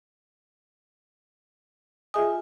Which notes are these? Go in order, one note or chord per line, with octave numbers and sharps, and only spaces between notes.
F4 G#4 D#5 E5 G#5 D#6